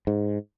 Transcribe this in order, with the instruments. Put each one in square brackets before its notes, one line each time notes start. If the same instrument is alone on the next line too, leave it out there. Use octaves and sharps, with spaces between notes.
[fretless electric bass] G#2